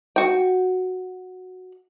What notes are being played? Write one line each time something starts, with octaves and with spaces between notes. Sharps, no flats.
F#4 G5